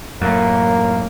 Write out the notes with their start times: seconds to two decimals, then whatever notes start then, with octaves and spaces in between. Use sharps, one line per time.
0.22 F#2 A2 A#3